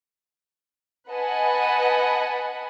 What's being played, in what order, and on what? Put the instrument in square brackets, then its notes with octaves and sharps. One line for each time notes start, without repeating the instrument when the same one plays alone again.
[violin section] B4 D#5 F#5 G#5 A5 B5